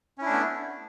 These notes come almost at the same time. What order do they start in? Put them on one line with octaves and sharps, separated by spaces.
C#4 E4 D4 A3 B3